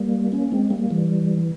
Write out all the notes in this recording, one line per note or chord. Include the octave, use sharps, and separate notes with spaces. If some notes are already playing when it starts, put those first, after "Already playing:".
Already playing: G3 A#3
A#3 C#4
G#3 C4
G3 A#3
E3 G3